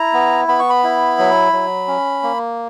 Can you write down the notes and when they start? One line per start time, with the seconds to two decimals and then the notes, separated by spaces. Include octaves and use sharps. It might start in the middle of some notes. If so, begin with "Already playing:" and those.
Already playing: E4 A#5
0.13 B3
0.48 B3 B5
0.59 C#6
0.70 B5
0.84 E4
1.19 F#3
1.53 F#3
1.88 C#4
2.23 A#3